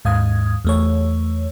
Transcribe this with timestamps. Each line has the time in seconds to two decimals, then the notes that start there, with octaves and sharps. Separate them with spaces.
0.05 D#2 G#2 F5 D#6 G#6
0.65 E2 A3 C#5